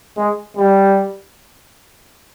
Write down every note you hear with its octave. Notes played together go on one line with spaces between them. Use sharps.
G#3
G3